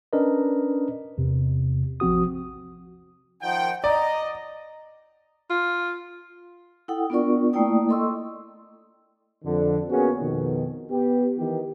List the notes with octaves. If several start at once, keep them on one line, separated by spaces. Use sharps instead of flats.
C#4 D4 A#4 B4 D5 D#5
E2 C3
A1 F3 C4 F#4 D#6
D#3 F3 F#5 G5
D5 D#5 A#5
F4
E4 A4 F#5 G5 D#6
B3 D4 F4 A#4 D5 C#6
A3 A#3 E4 D5 G5 D#6
A4 D#5 C6 C#6 E6
F2 D3
A#3 B3 C#4 F#4 G#4
F2 B2 D#3
B3 G4
D#3 E3 G4